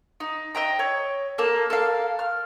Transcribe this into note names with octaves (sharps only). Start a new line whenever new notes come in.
D#4
D#5 E5 G5 A#5
C#5
A#3 A4
A4 A#4 F5
F6